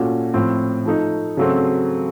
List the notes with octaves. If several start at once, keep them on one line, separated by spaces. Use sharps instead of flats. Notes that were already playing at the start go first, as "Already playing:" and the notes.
Already playing: A#2 A3 C#4 F#4
A2 F3 C4
F3 A3 D#4
C#3 F#3 A3 C4